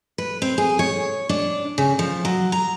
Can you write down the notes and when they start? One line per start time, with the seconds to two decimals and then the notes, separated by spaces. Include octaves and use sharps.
0.18 B4
0.42 C4
0.58 G#4
0.79 C#5
1.29 D4
1.78 C#3
1.99 F3
2.25 F#3
2.52 A#5